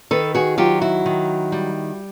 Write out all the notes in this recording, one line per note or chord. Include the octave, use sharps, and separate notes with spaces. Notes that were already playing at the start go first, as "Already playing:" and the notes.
D#3 A4 B4
F#4 G#4
F#3 F4 G4
E4 F#4
D#3
G3